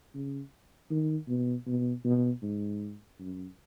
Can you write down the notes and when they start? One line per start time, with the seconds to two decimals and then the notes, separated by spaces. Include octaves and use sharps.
0.14 C#3
0.90 D#3
1.28 B2
1.67 B2
2.04 B2
2.43 G#2
3.19 F#2